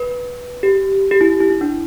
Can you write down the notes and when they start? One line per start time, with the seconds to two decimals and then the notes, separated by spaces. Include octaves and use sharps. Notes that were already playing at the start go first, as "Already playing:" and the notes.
Already playing: B4
0.63 G4
1.11 G4
1.21 E4
1.40 E4
1.50 E4
1.61 D4